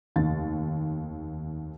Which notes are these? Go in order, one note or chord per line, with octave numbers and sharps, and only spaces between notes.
F1 D#2 A6